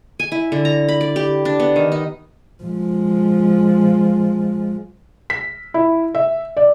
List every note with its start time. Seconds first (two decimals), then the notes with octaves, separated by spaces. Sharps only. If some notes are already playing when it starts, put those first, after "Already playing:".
0.20 G#5
0.32 E4
0.52 D3
0.65 A#5
0.88 B5
1.01 D5
1.16 G4
1.45 D4
1.60 B3
1.76 D#3
1.92 D#4
2.64 F3 G#3
5.30 B6
5.74 E4
6.15 E5
6.57 D5